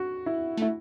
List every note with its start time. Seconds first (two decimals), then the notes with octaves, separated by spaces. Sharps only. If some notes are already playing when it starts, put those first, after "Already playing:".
Already playing: F#4
0.26 E4
0.57 A3 E4